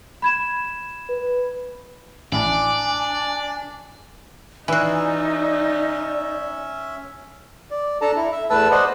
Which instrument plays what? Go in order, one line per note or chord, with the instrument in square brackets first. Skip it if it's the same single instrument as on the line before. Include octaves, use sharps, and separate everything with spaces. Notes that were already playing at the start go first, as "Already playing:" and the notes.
[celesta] B5 G#6 E7
[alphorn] B4
[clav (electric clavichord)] A1 E4 [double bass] D4 [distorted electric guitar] D5 [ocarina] G#5
[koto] E3 F#4 [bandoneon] C#4 E5 [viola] D#4 [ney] D5
[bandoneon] D5
D4 A4 A5 A#5
E4
E5
E2 A3 B4 A5 E6
C5 D5 D#5 F#5